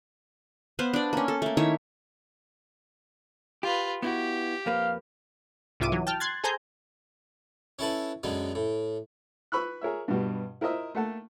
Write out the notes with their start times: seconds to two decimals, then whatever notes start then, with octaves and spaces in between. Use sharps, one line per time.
0.79 B3 B4 C5 F5
0.93 D4 D5
1.13 A#3 C#4
1.28 A4
1.42 A3 A#3
1.57 D#3 D#4 E4 C#5
3.63 F4 G4 B4
4.03 B3 E4 F#4 G4
4.66 F2 A#3 B4 F5
5.80 C2 G#2 F4 E5 D6 D#7
5.92 E3 F#3
6.07 G5 A5 F6
6.20 C6 F#6 G#6 A6
6.44 G#4 A4 C5 G#5 A#5 G6
7.79 C#4 E4 A4 B4
8.23 F#2 D3 G#3 B3
8.55 A2
9.52 B4 B5 C#6 E6 F#6
9.81 G#4 A#4 C#5 E5
10.08 G2 B2 G3
10.61 E4 A#4 C5 D#5 E5
10.95 A3 A#3 A4 F#5 A5